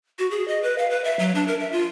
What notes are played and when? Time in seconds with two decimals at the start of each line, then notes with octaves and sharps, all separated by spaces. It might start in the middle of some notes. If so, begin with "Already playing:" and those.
0.19 F#4
0.31 G#4
0.48 D#5
0.63 B4
0.78 F5
0.90 B4
1.04 E5
1.19 F#3
1.35 D4
1.48 A#4
1.60 E5
1.72 F4